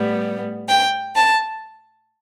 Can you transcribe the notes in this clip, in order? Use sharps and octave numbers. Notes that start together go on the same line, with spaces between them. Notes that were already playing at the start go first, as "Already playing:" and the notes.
Already playing: A2 G3 B3
G5
A5